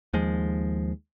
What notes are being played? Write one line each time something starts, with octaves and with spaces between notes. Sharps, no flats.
D#2 F3 G#3